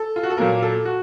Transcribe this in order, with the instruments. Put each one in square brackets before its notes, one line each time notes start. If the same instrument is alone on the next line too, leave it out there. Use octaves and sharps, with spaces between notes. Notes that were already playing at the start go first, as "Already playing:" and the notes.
Already playing: [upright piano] A4
F4
F#4
A4
A#2 F#3 A#3 A#4
A4
F#4